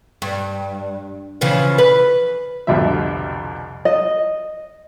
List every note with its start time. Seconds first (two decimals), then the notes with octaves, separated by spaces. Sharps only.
0.22 G2
1.41 C#3 E3 F3
1.78 B4
2.67 C2 F2 B2 D3 F3 E5
3.85 D#5